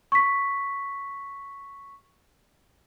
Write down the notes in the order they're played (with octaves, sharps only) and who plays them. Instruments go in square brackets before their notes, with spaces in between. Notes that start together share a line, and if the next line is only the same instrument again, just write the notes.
[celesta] C#6 B6